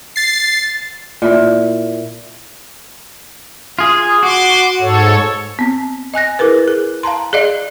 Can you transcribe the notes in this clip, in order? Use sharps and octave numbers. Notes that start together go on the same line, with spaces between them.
A6 C7
A#2 E4
F4 G#4
F#4 C6 D6
G#2 A4 C#5
B3 C4
D#5 G#5 F#6 A#6
E4 G#4 A#4 B4
G#4
F5 A5 A#5 C6
G#4 D5 D#5 F5